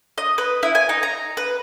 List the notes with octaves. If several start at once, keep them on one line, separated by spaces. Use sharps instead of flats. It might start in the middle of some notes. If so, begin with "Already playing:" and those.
D#5
B4
E4
G#5
D#4
A#5
B4